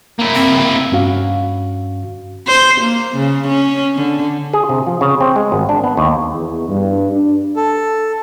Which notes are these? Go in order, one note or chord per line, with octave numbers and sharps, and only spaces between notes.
A#3 E4
C4
G2 C#4 F#4 F5
C5
A#3
C#3
C#4
D3
G#4
C3
F3
C#3
C4
G#3
G#1
D4
B3
D#2
E2
G2
D4
A4